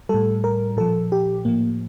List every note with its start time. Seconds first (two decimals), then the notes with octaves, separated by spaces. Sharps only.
0.09 A2 G3 A4
0.44 A#4
0.77 A#2 F3 A4
1.12 G4
1.45 A2 F3 A#3